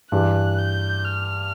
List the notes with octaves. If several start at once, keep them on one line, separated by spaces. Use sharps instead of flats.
G2 E3 G3 F#6
G6
F6